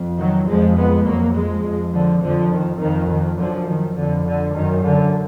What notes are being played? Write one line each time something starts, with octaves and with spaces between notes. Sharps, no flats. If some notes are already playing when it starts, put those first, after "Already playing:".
Already playing: F2
D#3 F#3
F2 F3 G#3
G#3 B3
F2 F#3 A#3
F3 G#3
F2
D3 F3
F2 D3 F3
D#3
F2 D#3
D#3
F#2 D3 F3
D#3
F2 D3
D3
F#2 D#3
D3